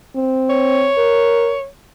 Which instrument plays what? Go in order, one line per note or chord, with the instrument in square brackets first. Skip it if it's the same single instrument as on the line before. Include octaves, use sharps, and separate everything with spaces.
[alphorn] C4
[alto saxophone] C#5
[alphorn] A#4